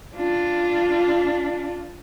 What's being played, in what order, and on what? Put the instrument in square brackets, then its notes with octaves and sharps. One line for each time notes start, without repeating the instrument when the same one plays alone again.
[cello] D4 F4